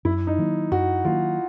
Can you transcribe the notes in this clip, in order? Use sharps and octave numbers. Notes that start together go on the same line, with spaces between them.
F#2 E4
D#4
D#3 F#3 A#3
F#2 F#4
D#3 F#3 A#3 F4